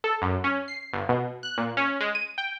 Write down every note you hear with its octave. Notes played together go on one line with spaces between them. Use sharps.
A4
F#2
C#4
C7
G1
B2
F#6
A#2
C#4
G#3
D#7
G5